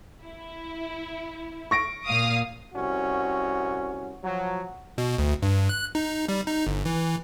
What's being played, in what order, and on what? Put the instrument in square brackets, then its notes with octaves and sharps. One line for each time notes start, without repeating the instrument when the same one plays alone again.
[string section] E4
[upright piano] C#6 A#6 D7
[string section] A#2 F5 D#6
[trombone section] C2 C#4 F#4
F3 F#3
[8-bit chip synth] B2
D2
G2
F#6
D#4
G3
D#4
G1
E3